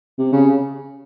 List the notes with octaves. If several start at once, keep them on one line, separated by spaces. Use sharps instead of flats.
C3
C#3